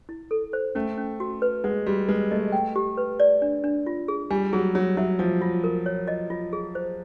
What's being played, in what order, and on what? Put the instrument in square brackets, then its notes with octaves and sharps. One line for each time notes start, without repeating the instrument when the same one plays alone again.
[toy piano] E4
A4
C5
[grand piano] A3 [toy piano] C#4
[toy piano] C#4
F#4
B4
[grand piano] G#3 [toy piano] F#5
[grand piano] G3 [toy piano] F#4
[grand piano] G#3 [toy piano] B4
[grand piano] A3 [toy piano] D#5
[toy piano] G5
G4
B4
D5
D4
D4
F4
G#4
[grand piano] G3 [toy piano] G#5
[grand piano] F#3 [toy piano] G#4
[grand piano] F#3 [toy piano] C#5
[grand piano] F#3 [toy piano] E5
[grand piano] F3 [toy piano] F#5
[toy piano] F4
A#4
C#5
D#5
F4
G#4
C5